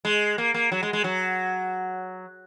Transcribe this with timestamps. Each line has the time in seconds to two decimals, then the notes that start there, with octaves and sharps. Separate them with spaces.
0.05 G#3
0.38 A#3
0.54 A#3
0.72 F#3
0.83 G#3
0.93 G#3
1.04 F#3